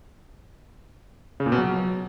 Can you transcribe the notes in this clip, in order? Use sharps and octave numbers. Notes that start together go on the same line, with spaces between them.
C#3
A#2
B2
F#3